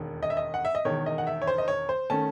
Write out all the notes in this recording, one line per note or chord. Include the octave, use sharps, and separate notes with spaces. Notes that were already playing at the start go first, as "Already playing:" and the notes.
Already playing: E1 D#2 D#3
D#5
E5
D#5
F#5
E5
D#5
E1 E2 D#3 C#5
D#5
F#5
E5
C#5
C5
D#5
C#5
C5
D#3 A3 C#4 A5